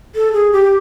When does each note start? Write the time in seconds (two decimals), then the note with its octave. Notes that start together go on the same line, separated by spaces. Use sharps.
0.15 A4
0.33 G#4
0.52 G4